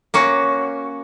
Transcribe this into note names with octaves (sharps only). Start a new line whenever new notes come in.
A#3 C#4 F#4